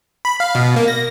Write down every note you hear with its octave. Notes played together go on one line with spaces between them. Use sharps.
B5
F5
B2
A#3
A#6